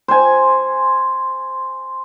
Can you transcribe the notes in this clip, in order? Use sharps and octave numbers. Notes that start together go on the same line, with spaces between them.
C5 G#5